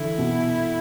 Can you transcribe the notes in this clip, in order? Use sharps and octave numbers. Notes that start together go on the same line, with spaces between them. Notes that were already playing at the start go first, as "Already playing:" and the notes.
Already playing: D3 E3 E4
B2